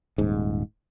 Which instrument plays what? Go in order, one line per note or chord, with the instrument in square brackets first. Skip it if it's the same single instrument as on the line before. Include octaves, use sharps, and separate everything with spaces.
[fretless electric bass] D#1 G#2